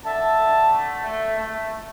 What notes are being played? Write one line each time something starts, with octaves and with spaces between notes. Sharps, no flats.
D3 E5 A5
D3
A3
A3
A3
A3